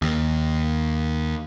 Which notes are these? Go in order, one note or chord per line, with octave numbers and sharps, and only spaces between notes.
D#2